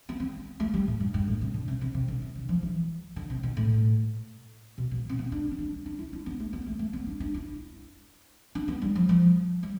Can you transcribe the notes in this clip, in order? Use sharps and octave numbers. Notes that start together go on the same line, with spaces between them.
B3
C4
A3
G3
A2
G2
G2
A2
C3
D3
C3
C3
C3
D3
C3
D3
F3
E3
D3
C3
B2
A2
B2
B2
C4
B3
D4
C4
D4
D4
E4
D4
B3
A3
B3
A3
A3
B3
D4
D4
E4
D4
B3
G3
F3
F3
G3